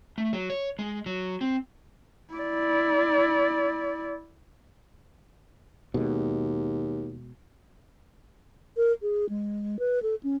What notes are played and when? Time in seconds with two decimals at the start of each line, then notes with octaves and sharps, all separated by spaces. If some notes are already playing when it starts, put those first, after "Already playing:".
0.18 A3
0.33 F#3
0.50 C#5
0.79 G#3
1.06 F#3
1.41 C4
2.34 E4 D5
5.94 D#2 B2 G#3
8.77 A#4
9.02 G#4
9.29 G#3
9.79 B4
10.02 A4
10.23 C#4